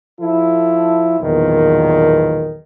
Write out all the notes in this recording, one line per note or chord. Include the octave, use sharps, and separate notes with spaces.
F3 E4 A4
B1 E2 A#2 D#3